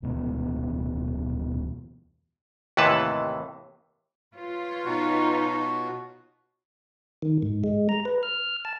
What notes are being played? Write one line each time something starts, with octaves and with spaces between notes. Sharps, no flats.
D1 E2 B2
D#2 A2 C3 E3 B4 A5
F4 B4 C#5
B2 D#4 F#4
D#3
G#2
G#3
A#5
B4
F6
A5